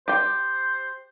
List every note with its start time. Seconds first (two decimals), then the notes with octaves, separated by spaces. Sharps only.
0.08 G4 C5 G5